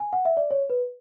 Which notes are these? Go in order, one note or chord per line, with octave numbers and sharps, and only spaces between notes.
G#5
F#5
E5
D5
C#5
B4